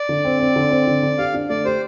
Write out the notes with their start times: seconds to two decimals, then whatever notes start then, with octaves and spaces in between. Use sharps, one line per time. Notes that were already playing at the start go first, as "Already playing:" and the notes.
Already playing: D5
0.09 D3
0.25 C4
0.40 C4
0.56 D3
0.71 C4
0.88 D3
1.03 D3
1.18 G4 F5
1.34 D4
1.50 A3 D5
1.65 G4 C5